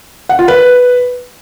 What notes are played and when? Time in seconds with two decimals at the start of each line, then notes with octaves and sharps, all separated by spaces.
0.29 F#5
0.39 F4
0.48 B4